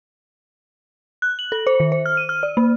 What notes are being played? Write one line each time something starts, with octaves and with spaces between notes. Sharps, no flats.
F#6
F#7
A4
C5
D#3
C5
F6
D#7
F6
D5
A#3